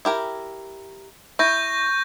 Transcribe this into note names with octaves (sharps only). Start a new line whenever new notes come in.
E4 G4 A#4
E4 C#6 G6 A#6